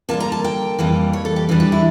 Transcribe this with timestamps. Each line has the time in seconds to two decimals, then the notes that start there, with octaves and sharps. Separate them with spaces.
0.09 D3 G3 A#3 A5
0.20 A#5
0.32 A5
0.44 G5
0.79 F2 E3 G3 A#3
1.13 C#5
1.25 A4
1.36 G4
1.49 E2 E3 G3 D4
1.60 G4
1.72 E4